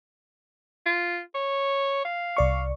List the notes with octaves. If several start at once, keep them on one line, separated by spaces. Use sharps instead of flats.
F4
C#5
F5
C2 D5 C#6